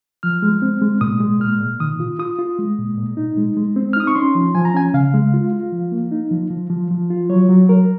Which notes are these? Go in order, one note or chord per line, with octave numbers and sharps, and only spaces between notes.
F3 F6
G#3
C4
G#3
A#2 D#6
G#3
A#2 F6
A#2
D#3 D#6
F4
F4 D#6
F4
G#3
A#2
A#2
D#4
G#3
G#3
C4
F6
D#4 D#6
C#6
C#4 C6
F3
F3 G#5
A#5
C#4 G#5
C#3 F5
G#3
F4
F4
F3
A#3
D#4
F3
F3
F3
F3
F4
F#3 C#5
F#3
F#3 A#4